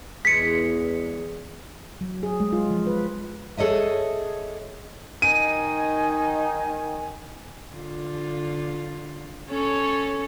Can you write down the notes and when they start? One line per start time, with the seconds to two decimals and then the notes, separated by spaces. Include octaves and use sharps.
0.25 E2 E3 G#3 G#4 B6 C#7
2.01 F#3
2.23 G#4
2.40 G#3
2.53 F4
2.71 F3
2.87 B4
3.57 G#4 A4 C#5 D#5 E5
5.22 D#3 D#4 D#5 G#5 D#7
7.74 D3 F4
9.49 C#4 A4 C#5